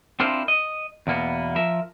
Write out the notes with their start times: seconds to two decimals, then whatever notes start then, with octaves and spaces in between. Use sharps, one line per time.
0.20 C4 D4 E4 F4 A#4 C5
0.48 D#5
1.07 E2 B2 A#3 B3
1.56 F3 A#4 E5